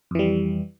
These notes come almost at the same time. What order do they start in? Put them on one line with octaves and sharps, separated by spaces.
F2 E3 G3